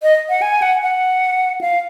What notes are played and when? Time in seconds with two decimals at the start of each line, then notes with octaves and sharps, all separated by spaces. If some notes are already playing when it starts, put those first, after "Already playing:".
0.03 D#5
0.29 F#5
0.42 G#5
0.62 F#5
0.82 F#5
1.61 F5